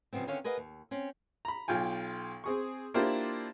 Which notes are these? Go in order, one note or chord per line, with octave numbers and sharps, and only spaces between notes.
C#3 F3 G3 B3 C4
D3 D#3 C4 C#4 C#5 F5
G#4 A#4 B4 D#5 F5 F#5
D#2
C4 C#4
A#5 B5
B1 F4 G5 G#5
C4 G#4 C#6
A#3 D4 E4 F4 G4 C5